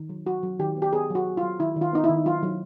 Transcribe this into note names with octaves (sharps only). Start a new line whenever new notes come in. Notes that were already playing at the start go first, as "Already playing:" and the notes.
Already playing: D#3
F#3
F#3 F#4
F#3
D#3 G4
B3
G4
B3 G#4
F#3
F#4
F#3
F4
F#3
D#3 E4
D#3
F4
B3 D#4
E4
D#3
F#3 F4
F#3